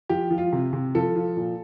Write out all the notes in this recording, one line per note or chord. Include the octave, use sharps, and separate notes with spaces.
F3 G4
F3
F4
C3
C3
F3 A4
F3
A#2